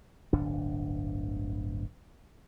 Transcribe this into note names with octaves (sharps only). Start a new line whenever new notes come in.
D1 G1 D4